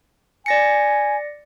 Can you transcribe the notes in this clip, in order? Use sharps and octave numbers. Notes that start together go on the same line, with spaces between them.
D5 G#5 A#6 C#7